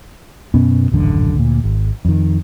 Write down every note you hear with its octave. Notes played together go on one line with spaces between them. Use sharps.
F#2 B2 B3 C#4
D#1 A1 F#2 D3
D2 A#2
G#1
F2 D#3